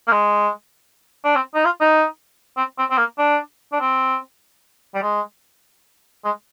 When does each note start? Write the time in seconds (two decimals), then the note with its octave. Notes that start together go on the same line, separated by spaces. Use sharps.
0.07 A#3
0.12 G#3
1.25 D4
1.35 C4
1.55 D#4
1.65 F4
1.81 D#4
2.57 C4
2.78 C4
2.91 C4
2.98 A#3
3.19 D4
3.73 D4
3.80 C4
4.95 G3
5.02 G#3
6.24 G#3